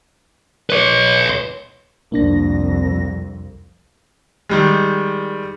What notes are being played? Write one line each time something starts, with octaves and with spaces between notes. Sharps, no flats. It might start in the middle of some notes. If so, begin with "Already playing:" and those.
B4 C#5
C2 F2 A#3 D4 A#6
D#3 G3 G#3